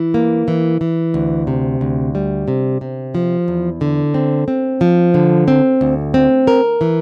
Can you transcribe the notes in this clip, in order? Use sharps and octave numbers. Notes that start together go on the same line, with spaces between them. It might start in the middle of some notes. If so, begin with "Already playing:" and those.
Already playing: E3
A#3
E3
E3
D2
C3
D2
G3
C3
C3
F3
E2
D3
C4
C4
F3
D3
C4
D2
C4
A#4
E3